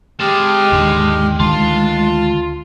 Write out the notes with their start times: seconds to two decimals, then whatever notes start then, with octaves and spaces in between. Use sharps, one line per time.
0.20 G#3 G4 D#5 A5 F6
0.72 D#2 G#2 D3
1.40 D2 D3 D#3 F4 A5 C6